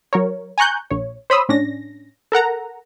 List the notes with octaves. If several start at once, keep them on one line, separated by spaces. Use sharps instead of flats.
F#3 A#4 C#5
G#5 A#5 C#6 F#6 G6
A#1 C#5
C5 C#5 B5 C6 D#6 E6
A2 C#4 D4 A#6
A4 A#4 F#5 A#5